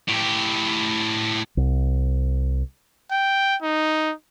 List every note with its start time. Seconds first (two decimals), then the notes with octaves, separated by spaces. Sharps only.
0.09 A2 G4
1.57 C2
3.11 G5
3.62 D#4